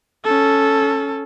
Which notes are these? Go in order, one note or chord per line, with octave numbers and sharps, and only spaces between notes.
C#4 A4